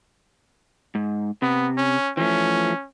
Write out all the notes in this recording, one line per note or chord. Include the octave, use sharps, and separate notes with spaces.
G#2
C3 B3
C#4
E3 F3 A3 C#4